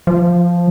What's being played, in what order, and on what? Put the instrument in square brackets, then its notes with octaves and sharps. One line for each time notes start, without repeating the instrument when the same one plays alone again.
[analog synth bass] F3